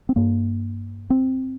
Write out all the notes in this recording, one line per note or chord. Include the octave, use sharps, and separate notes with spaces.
C4
G2 A#3
C4